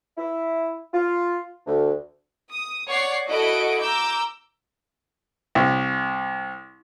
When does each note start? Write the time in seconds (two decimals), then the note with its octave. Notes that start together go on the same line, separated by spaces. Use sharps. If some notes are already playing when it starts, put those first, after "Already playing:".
0.18 E4
0.94 F4
1.67 D2
2.51 D#6
2.88 C#5 D5 F#5 C7
3.27 E4 F#4 A4 D#5 F#5 D7
3.81 A#5 D6 E6 G6
5.55 C2